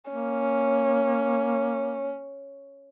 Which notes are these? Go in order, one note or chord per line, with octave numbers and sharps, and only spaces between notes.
A#3 C#4